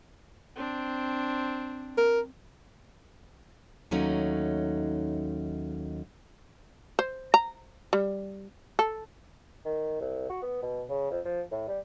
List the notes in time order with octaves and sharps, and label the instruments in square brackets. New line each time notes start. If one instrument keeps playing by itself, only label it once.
[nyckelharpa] C4 D4
[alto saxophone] A#4
[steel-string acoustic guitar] D#2 F#3 A3 C#4 D#4
[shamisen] C5
A#5
G3
A4
[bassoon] D#3
C2
F#4
B3
B2
C#3
F2
F3
A2
G3